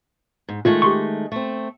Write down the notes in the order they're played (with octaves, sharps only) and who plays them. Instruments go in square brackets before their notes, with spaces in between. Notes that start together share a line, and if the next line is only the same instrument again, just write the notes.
[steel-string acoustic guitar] G#2
[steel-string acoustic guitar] D#3 G#3 A3 [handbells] F4
[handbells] G4 C6 C#6
[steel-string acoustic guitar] A3 C4